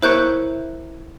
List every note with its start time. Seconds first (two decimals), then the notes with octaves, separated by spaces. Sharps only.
0.02 E4 A#4 C5 C#5 F#6 G6